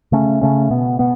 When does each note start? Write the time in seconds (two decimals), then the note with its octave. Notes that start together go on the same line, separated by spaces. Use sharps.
0.12 C#3 A3 C#4
0.41 C#3 A3 C#4
0.71 B2 B3
0.99 B2 B3